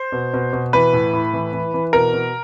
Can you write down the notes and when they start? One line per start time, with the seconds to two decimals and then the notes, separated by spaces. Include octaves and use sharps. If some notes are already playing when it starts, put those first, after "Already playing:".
Already playing: C5
0.12 B2
0.34 B2
0.53 B2
0.73 E3 B4
0.93 A2
1.13 A2
1.33 E3
1.53 E3
1.74 E3
1.93 B2 A#4
2.13 B2